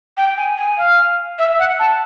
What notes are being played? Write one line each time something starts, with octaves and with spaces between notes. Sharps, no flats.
G5
G#5
G#5
F5
E5
F#5
A5